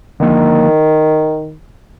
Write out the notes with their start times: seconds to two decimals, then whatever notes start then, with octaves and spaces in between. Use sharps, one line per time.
0.20 D3 D#3 F3 A#3